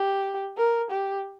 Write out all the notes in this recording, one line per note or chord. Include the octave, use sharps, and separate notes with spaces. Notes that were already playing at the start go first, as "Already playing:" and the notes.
Already playing: G4
A#4
G4